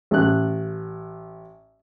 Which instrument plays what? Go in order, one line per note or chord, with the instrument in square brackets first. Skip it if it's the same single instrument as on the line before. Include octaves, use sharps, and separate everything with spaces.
[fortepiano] A1 F#6